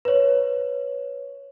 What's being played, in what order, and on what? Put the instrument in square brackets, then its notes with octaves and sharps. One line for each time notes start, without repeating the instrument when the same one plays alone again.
[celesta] B4 C#5